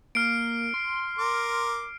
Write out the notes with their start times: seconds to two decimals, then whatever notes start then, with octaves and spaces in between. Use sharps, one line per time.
0.15 A#3 F6 C7 D7
0.74 C6
1.19 A#4 D6